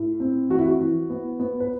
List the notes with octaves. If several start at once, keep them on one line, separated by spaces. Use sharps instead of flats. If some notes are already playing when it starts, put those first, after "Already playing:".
Already playing: A2
C4
E3 F#4
E4
F#4
E3
B3
B3
B4